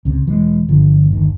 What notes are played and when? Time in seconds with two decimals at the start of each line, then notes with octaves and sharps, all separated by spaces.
0.05 C#2 C3
0.26 E1 E3 F3 G#3
0.69 G1 D3 F3
1.11 G1 D#2 D#3